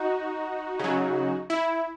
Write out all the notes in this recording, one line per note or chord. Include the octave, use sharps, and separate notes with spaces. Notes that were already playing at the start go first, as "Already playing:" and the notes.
Already playing: D#4 F#4
C#3 F#3
E4